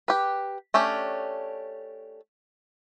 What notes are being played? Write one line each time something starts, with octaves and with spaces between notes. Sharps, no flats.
G4 B4
A3 C#4 D4 G4